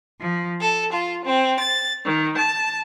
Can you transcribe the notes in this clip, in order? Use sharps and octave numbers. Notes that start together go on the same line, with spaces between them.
F3
A4
F4
C4
A6
D#3
A5